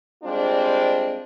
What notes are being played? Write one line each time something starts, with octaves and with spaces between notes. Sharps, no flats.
G3 G#3 C4 D4 F4